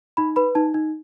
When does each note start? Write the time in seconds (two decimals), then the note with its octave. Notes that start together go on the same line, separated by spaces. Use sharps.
0.17 D#4 B5
0.36 B4 B5
0.55 D#4 A5
0.74 D#4